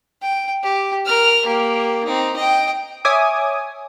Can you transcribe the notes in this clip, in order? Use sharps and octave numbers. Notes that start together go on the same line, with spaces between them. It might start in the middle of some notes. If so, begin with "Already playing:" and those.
G5
G4
A#4 F6
A#3 G4
C4 D#4
D#5 G5
C#5 E5 G#5 D6 D#6